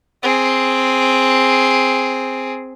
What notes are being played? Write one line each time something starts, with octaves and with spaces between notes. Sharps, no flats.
C4 G#4